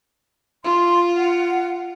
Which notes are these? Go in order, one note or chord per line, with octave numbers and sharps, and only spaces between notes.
F4 C6
F#5